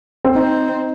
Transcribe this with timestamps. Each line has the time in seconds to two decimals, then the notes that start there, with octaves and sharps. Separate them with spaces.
0.25 C4
0.35 C4 D#4